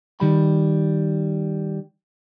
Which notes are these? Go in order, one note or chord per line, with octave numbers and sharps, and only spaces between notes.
D#3 G3 B5